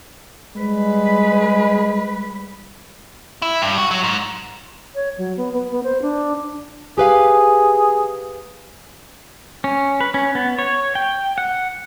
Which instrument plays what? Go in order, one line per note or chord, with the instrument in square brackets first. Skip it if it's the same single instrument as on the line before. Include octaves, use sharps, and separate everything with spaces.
[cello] G3 B4 [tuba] G#3
[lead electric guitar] E4
G2
F#4
F#3
G#2
[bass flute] C#5
F#3
B3
B3
B3
C5
D4
[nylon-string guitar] G4 B4 F5 [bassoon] G#4
[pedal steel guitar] C#4
B4
C#4
B3
C#5
G5
F#5